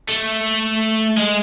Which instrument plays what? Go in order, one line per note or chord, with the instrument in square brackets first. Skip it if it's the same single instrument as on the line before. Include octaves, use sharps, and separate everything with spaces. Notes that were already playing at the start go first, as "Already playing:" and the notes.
[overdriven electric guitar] A3
G#3